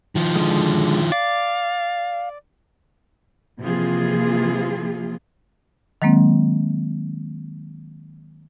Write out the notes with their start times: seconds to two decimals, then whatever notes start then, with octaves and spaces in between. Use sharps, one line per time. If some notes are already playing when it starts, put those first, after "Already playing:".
0.15 D#3 F3
0.36 D3 G#3
1.12 D5 F5
3.60 C3 E3 F3 A#3 F4 G#4
6.02 D#3 F#3 G#3 A#3 C4